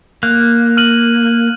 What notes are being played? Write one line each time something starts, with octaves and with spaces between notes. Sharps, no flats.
A#3 F#6
F6 D#7 F#7